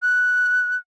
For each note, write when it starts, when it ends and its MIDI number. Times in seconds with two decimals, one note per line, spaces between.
0.02 0.77 90